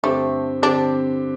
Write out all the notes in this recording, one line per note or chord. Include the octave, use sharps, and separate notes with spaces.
G2 D3 A3 C4 G4
D3 C4 D4 G4